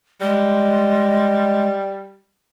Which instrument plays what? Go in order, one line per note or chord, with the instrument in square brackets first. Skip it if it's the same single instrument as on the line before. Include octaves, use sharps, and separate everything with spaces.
[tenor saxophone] G3 [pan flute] G#3